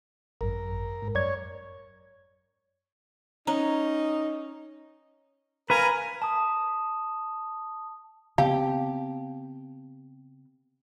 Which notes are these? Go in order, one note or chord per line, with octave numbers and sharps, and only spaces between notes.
G#1 F#2 A#4
G#2
F#2 C#5 D5 G#6
C#4 D#4 A#5
A#4 B4 F5 G#5 A#5
A5 D#6
C#3 B3 C4 G4 F5 A5